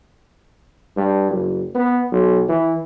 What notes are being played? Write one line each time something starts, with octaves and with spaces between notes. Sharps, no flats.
G2
F#1
B3
B1
E3